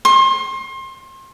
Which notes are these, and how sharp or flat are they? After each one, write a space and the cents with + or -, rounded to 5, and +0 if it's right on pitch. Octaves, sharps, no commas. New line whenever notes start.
C6 +30